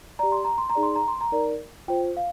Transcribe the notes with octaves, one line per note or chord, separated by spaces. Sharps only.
G4 D5 A#5
C6
A#5
C6
A#5
D#4 G#4 D5
C6
A#5
C6
A#5
D#4 A#4 D5
F4 C5 G5
F5